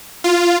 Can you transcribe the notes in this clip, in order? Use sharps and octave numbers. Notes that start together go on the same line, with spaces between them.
F4